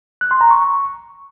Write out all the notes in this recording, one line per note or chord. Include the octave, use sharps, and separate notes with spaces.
F#6
C6
A#5
C#6